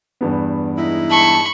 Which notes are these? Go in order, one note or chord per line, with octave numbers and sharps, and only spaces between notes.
E2 G2 B3
G#3 D#4 E4
A5 B5 C#6